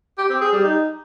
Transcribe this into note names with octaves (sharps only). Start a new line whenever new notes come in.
G4
C4
G#4
G3
D#4